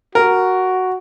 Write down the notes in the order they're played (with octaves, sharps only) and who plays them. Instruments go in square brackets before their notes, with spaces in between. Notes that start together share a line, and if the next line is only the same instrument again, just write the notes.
[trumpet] F#4 [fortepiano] A#4